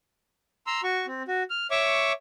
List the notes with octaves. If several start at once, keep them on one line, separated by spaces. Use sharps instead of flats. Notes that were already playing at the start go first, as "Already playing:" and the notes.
A#5 C6 E6
F#4 C#6
C4
F#4
F6
C#5 E5 C#6 D6